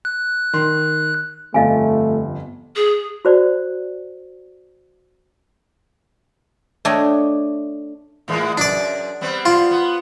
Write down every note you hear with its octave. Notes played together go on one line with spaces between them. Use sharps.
F#6
D#3 C6
G1 F2 A3 D#5 F5 G#5
G#4
F#4 C5 D5
A3 D4 C#5 D#5 G5
A2 E3 G#3
F#2 D4 D5
G3 B3 C4
F4
B3